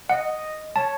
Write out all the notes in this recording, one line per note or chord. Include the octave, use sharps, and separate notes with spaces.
D#5 F#5
C#5 A5